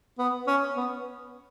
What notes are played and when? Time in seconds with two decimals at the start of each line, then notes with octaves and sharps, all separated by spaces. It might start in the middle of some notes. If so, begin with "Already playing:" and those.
0.19 B3
0.47 C#4
0.77 B3